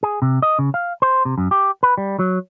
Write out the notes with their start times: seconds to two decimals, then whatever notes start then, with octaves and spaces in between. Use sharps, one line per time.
0.03 G#4
0.22 C3
0.42 D#5
0.59 C#3
0.74 F5
1.02 C5
1.25 C3
1.38 F#2
1.51 G4
1.83 B4
1.98 G3
2.19 F#3